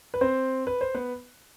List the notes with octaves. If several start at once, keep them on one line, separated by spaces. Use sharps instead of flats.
B4
C4 C5
B4
C5
B3 B4